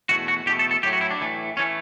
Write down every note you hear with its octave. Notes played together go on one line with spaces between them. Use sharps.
E2 B2 A3 F#4
F#4
E2 B2 A3 G4
A4
A4
A2 F#3 A3 G4
F#4
E4
D4
A2 E3 A3
E3 A3 C#4